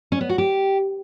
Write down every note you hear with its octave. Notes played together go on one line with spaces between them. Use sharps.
C#4
B3
F#4
G4